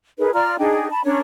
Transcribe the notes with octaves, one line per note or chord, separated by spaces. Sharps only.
D#4 G#4 A#4 B4
F4 D5 A#5 F6
D4 D#4 G#4 G5
A5 B5
C#4 D4 A#4 C#5